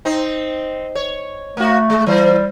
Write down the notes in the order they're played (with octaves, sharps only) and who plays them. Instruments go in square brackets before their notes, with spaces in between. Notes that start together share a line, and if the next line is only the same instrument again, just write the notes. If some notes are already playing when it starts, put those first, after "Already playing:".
[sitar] C4 D#4
C#5
[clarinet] A3 [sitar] A#3 F#4
[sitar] G#3
[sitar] E3 C5 [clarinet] G3